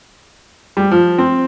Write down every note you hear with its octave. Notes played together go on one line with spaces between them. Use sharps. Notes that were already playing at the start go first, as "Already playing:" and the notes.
G3
F3
C4